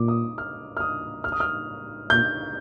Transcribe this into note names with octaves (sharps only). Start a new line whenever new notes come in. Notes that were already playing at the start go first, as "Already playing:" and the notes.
Already playing: A#2 D6
D#6
F6
F6
D#6
F6
D#6
F6
A#2 G6